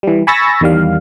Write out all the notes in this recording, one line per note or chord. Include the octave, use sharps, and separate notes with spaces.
E3 G3
G#5 B5 C#6 E6 A6 A#6
E2 D#3 G3 F5